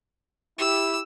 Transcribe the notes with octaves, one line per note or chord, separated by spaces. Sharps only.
E4 G4 E6